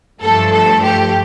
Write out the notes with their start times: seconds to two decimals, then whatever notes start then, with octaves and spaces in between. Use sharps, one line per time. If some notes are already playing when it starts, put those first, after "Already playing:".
0.22 G2 F3 A3 A4
0.53 A4
0.84 G4